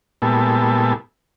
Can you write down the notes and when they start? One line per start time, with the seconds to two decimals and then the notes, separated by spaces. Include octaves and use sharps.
0.22 A#2 G3 G#3 B3 E4 A4